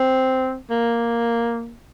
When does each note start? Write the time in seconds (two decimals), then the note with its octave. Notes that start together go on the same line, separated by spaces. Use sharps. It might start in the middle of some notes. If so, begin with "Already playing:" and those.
Already playing: C4
0.70 A#3